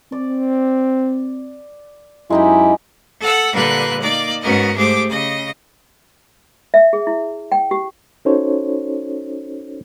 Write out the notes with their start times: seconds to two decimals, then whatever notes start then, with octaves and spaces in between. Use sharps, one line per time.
0.12 C4 D5
2.30 F#2 G#3 D#4 E4 G4
3.20 A4 F#5 E6
3.53 A#2 D3 G3 A#4 B4 F#6
4.02 A#3 D#4 D5
4.42 G#2 B3 C#4 F#4 A#4 D#5
4.76 G#2 A3 G4 G#4 C5 D6
5.09 C#3 D#5
6.74 E5
6.93 G#4
7.07 E4
7.52 G5
7.71 G4
8.25 C#4 D#4 F#4 A4 C5 C#5